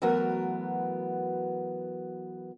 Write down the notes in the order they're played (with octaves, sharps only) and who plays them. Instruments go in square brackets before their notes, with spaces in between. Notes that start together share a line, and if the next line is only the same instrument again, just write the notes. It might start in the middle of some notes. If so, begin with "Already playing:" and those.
[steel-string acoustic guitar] E3 F#3 A3 B3 F#4 A#4